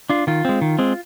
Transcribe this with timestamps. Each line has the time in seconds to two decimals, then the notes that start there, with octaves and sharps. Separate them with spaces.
0.10 D4 F4
0.27 D#3 F4
0.45 G#3 C4
0.62 D#3
0.79 G#3 C4